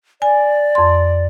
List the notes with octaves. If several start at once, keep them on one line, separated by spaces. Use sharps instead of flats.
D5 G#5
F2 C6